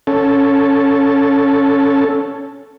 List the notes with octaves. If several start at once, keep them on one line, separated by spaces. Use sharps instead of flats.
C#4 A4